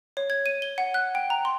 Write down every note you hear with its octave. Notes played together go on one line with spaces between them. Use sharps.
C#5
G#6
D#7
G7
F#5
F#6
G5
A#5
C6